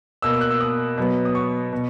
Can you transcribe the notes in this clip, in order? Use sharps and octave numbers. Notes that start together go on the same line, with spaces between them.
B2 A#3 E6
E6
F#6
E6
D#6
B2 F#3 B3
D#6
C#6
B2